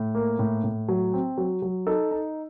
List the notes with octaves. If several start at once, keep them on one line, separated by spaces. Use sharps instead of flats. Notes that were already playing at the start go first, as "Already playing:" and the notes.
Already playing: A2
A#3
A2
A2
F#3
C4
F#3
F#3
D#4 A4
D#4